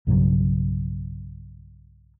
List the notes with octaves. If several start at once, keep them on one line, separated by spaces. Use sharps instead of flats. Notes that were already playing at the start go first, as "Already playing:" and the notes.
B1 G2 C#3 F#3